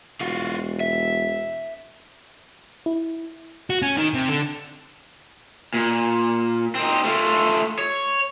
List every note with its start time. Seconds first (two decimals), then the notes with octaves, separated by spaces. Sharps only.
0.21 E1 F4 F#4
0.80 E5
2.86 E4
3.70 F#4
3.82 C#4
3.97 D#3
4.14 C3
4.29 D3
5.74 A#2
6.75 C4 D#4
7.05 A3 F4
7.79 C#5